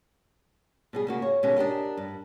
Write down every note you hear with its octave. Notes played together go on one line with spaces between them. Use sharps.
B2 G3 G#4
C#3 A#3 F#4
C#5
B2 D#3 G#3 C#4 G4
D4 G4 A#4 D#5
G2